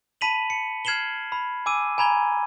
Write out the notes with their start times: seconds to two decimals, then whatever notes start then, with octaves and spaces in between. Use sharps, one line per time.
0.21 A5 B5 B6 D#7 F7 F#7
0.50 C#7
0.85 F6 G#6 C7 E7 F#7 G7
1.32 B5
1.66 G#5 D6 E6 D#7
1.98 G#5 A#5 B5 G#6 G7